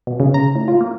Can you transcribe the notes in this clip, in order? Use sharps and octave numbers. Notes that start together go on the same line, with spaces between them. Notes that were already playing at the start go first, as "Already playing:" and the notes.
B2
C#3
A#5
A2
F4
A#3